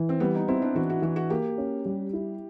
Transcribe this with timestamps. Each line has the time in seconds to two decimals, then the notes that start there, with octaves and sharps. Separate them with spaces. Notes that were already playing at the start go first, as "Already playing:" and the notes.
Already playing: E3
0.09 C4
0.20 G3 B3
0.35 D#4
0.48 C4 E4
0.62 D4
0.75 E3 F#4
0.90 F#4
1.02 E3 F#4
1.16 F#4
1.30 A#3 G4
1.58 C#4
1.86 G3
2.13 E4